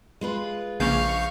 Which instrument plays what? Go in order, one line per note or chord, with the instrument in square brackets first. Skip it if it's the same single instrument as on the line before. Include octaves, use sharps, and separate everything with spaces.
[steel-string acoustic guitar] G#3 F4 B4
[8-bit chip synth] A#1 F5 G6 [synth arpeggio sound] C#3 A#3 C#4 [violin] C#6 F6